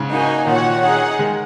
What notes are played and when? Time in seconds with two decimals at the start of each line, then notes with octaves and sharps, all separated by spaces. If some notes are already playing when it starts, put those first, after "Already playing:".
Already playing: G#2 C#3
0.11 A#3 D#4 F#4 D#5 G#5
0.47 A#2 D#3 F#4 C#5 F#5
0.82 D#4 G#4 F#5
1.19 D#3 G#3